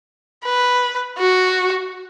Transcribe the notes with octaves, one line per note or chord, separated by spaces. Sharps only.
B4
F#4